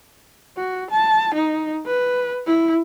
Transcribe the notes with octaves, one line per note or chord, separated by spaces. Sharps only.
F#4
A5
D#4
B4
E4